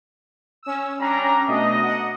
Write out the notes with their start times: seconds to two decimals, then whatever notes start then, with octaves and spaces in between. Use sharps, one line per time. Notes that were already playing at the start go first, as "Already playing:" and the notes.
0.63 C#4 E6
1.00 G3 C#4 D4 A#5
1.48 B2 A3 D4 D#5
1.83 F#5